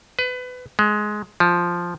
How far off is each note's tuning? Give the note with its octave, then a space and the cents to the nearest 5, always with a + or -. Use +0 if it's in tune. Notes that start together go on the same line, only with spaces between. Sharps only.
B4 +25
G#3 +15
F3 +0